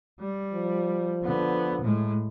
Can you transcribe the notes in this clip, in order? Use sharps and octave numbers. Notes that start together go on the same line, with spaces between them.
G3
F3
D3 B3
A2 G#3